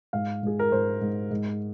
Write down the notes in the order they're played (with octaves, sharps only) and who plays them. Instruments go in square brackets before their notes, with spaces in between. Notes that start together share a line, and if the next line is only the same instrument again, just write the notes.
[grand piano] G#2 F5
G#2 G#4
A#4
G#2 C5
G#2
G#2